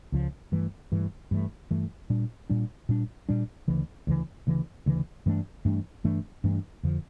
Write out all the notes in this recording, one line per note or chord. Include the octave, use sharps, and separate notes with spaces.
C#2 C#3 F3
G2 E3 A3
G2 E3 A3
G2 E3 A3
G2 E3 A3
A#2 G3 D4
A#2 G3 D4
A#2 G3 D4
A#2 G3 D4
D2 C#3 E3
D2 C#3 E3
D2 C#3 E3
D2 C#3 E3
G2 E3 A3 D4
G2 E3 A3 D4
G2 E3 A3 D4
G2 E3 A3 D4
F2 D3 F3